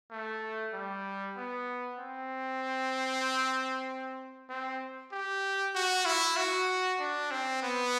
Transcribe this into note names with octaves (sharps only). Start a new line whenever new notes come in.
A3
G3
B3
C4
C4
G4
F#4
E4
F#4
D4
C4
B3